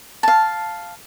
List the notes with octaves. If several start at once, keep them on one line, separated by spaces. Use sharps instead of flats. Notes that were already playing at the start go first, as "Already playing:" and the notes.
F5 A5